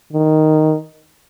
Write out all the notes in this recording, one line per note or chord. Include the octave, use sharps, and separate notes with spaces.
D#3